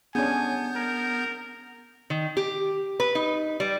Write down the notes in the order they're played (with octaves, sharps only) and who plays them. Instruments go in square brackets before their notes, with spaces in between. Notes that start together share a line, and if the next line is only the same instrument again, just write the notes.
[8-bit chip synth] B3 G6 [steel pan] C#4 D4 G#4 [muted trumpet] G#5
[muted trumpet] A#4
[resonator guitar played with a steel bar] D#3
G4
B4
D#4
G3